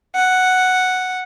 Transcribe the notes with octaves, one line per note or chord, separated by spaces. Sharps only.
F#5